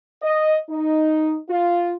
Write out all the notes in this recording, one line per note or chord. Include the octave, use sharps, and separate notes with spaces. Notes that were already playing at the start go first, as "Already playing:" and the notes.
D#5
D#4
F4